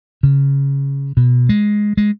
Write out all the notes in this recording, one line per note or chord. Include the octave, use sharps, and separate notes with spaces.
C#3
B2
G#3
G#3